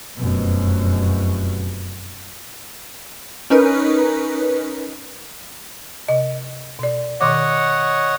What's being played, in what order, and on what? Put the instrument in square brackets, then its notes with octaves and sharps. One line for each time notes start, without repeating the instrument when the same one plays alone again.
[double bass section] F1 F#2 B2
[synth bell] C#4 D#4 A#4 B4
[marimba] C3 D#5
B2 D5
[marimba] B2 D#3 D6 [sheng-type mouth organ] C#5 D#5 F#5